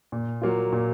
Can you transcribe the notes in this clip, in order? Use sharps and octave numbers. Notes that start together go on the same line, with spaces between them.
A#2
F#3 A#3 F4
A#2